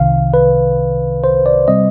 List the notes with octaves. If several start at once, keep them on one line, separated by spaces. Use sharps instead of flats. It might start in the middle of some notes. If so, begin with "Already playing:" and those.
Already playing: C2 C3 D#3 F5
B4
C5
D5
C3 G3 C4 D#5